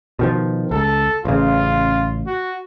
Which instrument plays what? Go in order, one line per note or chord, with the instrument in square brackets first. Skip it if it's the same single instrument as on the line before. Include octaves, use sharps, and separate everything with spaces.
[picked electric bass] B2 D#3 F3
[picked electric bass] C#2 [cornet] A4
[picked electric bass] A1 C#3 [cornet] F4
[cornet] F#4